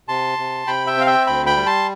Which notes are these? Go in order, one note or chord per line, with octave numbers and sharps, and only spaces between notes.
C3 A5 C6
C3
C3 G5 B5
E5 G5
C4 F5
E5 G5
D2 G5 B5
G5 B5
G3
A5 C6